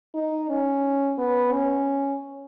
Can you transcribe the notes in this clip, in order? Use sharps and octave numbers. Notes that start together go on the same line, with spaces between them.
D#4
C#4
B3
C#4